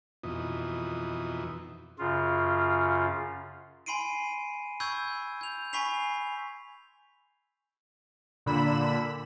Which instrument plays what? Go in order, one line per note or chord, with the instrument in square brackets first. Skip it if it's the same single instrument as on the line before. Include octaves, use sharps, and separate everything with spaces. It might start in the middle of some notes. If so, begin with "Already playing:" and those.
[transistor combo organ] F2 B2 E3 D#4
[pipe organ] F#2 C#3 F4
[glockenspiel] G#5 B5 C6 C7 D7 D#7
B5 C#6 E6 G6 G#6
G6 F7
G#5 B5 C#6 B6 C7 F7
[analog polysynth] A#2 D3 B5 E7